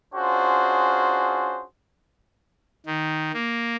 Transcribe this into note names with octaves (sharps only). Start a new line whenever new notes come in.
C#4 D4 F4 F#4 G#4 C5
D#3
A#3